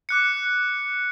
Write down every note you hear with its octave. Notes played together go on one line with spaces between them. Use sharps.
D6 F#6 C#7